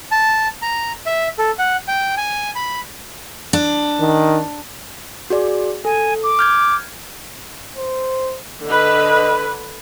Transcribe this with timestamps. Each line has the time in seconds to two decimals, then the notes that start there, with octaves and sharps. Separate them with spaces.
0.11 A5
0.62 A#5
1.06 E5
1.38 A4
1.58 F#5
1.88 G5
2.17 G#5
2.55 B5
3.53 D4
4.00 D#3
5.30 F#4 G#4 D5
5.85 A4 G#5
6.23 D6
6.39 F6 G6 G#6
7.76 C5
8.65 D3 B4 D#5